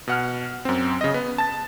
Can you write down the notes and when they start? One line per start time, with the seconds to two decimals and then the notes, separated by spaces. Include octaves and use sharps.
0.07 B2 F#5 F6
0.65 F#2 C4
1.01 C#3 D#5
1.14 B3
1.38 A5 A6